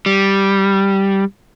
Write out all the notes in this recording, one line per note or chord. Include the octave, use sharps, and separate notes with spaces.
G3